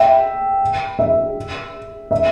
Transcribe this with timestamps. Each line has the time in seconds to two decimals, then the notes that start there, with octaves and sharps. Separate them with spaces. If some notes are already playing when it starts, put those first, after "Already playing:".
Already playing: E5 G5
0.99 E5
2.11 E5